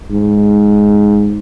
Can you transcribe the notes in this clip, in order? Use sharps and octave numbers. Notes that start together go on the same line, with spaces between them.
G#2